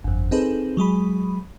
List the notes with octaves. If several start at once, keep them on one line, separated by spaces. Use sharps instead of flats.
G1 F2
C4 D#4 G#4 A4 B4 C5
F#3 G#3 G#4 B5